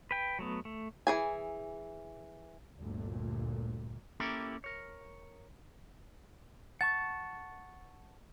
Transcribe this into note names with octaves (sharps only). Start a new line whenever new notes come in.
B4 G5
F#3 A3 B3
A3
E3 G#4 G#5
G1 D2 A#2
A#3 C#4 E4 G4 A4 A#4
A#4 C#5
F#5 A5 C#6 A6